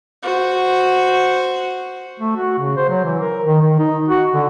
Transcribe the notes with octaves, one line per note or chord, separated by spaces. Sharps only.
F#4 C5
A3
F#4
C#3
C5
F#3
E3
A#4
D#3
D#3
D#4
F#4
D3